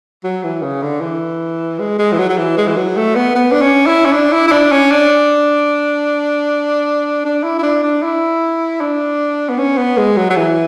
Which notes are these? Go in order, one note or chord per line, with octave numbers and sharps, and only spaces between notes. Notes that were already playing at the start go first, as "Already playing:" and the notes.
F#3
E3
C#3
D3
E3
G#3
G#3
E3
F#3
F#3
E3
G#3
E3
F#3
A3
B3
B3
D4
C#4
E4
C#4
D4
E4
E4
D4
C#4
D4
D4
E4
E4
D4
D4
E4
D4
B3
C#4
B3
G#3
F#3
F#3
E3